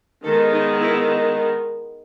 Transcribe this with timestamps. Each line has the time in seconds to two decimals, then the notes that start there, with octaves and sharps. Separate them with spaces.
0.24 D#3 G#3 B3 A4
0.53 D#4
0.82 E4